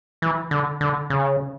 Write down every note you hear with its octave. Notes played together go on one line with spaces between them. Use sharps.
E3
D3
D3
C#3